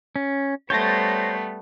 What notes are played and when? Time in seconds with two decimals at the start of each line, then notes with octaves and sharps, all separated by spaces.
0.16 C#4
0.70 G3 A3 B3 C5 C#5 G6 A6 A#6